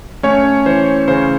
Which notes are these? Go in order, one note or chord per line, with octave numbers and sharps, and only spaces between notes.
A3 C#4 C#5
E3 C5
C#3 C5